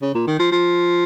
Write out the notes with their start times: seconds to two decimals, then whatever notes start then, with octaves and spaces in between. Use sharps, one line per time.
0.02 C#3
0.15 A#2
0.27 D#3
0.39 F3
0.52 F3